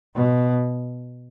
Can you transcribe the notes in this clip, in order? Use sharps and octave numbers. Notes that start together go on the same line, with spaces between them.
B2